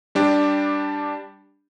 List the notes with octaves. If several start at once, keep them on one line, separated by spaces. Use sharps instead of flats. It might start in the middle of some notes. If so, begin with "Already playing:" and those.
G3 D4 G4